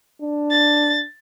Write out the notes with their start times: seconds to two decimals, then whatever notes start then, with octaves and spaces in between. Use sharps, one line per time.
0.21 D4
0.51 A6